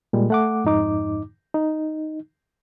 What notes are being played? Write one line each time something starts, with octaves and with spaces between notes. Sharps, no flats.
A#2 G3 G#3
A3 F#5 D6
F2 G#2 D#4 D6
D#4